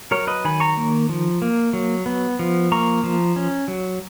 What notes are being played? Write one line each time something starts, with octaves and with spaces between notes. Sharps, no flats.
F#3 A#4 C#5
B4 D#5
D#3 G#5 B5
A#5 C#6
A#3
F3
A#3
F#3
B3
F3
A#3 A#5 C#6
F3
C#4
F#3